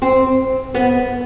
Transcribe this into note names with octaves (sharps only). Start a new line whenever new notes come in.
C4
B3